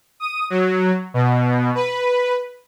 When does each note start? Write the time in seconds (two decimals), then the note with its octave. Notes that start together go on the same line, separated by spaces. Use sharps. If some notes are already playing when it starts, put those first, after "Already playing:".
0.20 D#6
0.50 F#3
1.14 B2
1.75 B4